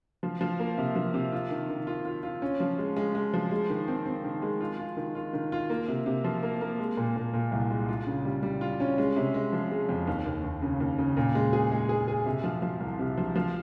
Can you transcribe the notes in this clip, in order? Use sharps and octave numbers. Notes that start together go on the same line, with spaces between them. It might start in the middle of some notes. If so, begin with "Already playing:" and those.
F3
F3
A#3
C3
F3
C3
F4
D#3
D#3
F4
F4
F4
C#4
F3
G#3
G#3
G#3
F3
G#3
D#3
C4
C4
D#3
G#3
F4
F4
D#3
F4
D#3
F4
A#3
C3
C3
F3
A#3
A#3
G#3
A#2
A#2
A#2
C2
G#3
F4
C#3
G3
G3
F4
C#4
G#3
C3
G#3
F3
G#3
F2
D#2
D#2
D#2
C#3
D#2
C#3
A#2
G#3
G#4
G#3
G#4
G#4
C3
F3
F3
C2
C3
F3
F3